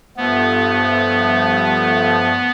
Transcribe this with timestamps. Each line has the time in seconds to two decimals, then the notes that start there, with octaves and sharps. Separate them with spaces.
0.16 G2 F3 A3 B3